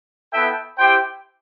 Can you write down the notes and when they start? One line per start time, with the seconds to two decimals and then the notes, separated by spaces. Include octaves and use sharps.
0.32 B3 E4 A4 E5 G5
0.78 E4 G4 C5 G5